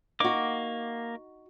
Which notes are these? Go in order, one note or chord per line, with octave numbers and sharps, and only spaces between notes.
A#3 D#4 F#4 D6